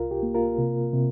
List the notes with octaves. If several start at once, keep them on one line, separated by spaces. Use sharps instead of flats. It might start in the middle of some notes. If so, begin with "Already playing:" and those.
Already playing: C2 F4 A#4
G4
A#3
F4 A#4
C3
C3